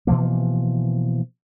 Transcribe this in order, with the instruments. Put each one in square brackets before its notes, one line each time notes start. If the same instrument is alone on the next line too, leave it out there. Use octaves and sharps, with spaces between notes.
[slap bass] B2 E3 F3 A#3